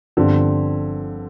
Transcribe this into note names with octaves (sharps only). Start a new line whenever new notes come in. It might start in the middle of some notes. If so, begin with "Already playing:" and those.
G1 G2 D3 F3 C4 F4